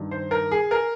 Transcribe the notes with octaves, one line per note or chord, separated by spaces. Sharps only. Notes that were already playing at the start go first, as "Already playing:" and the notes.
Already playing: G2 D#3
C5
A#4
G#4
A#4